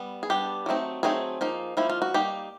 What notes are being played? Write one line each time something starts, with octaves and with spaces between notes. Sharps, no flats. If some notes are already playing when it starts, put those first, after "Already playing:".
Already playing: G3 B3
G#4
G3 B3 D4 G4
F#3 A3 C4 D#4
F#3 A3 C4 D#4 G#4
F3 A#3 D#4
F3 A#3 D#4 E4
F4
F#4
G3 A#3 D#4 G4